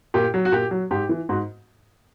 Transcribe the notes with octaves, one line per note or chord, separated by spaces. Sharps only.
A#2 G4
F#3
F#4
A#2 G4
F#3
G#2 G4
E3
G#2 F#4